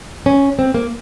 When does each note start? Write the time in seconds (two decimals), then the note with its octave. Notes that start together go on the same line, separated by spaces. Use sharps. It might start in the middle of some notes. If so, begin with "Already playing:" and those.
0.26 C#4
0.59 C4
0.74 A#3